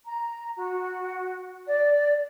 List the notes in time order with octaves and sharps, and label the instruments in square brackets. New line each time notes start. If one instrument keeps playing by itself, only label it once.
[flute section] A#5
F#4
D5